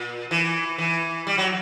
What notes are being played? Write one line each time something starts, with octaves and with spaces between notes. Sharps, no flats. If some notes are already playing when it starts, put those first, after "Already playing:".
Already playing: A#2
E3
E3
G3
F#3